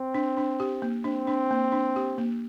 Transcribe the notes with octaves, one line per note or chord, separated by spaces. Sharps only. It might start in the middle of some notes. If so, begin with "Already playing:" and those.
Already playing: C4
D4
D4
G4
A#3
C4 D4
D4
A#3
D4
G4
A#3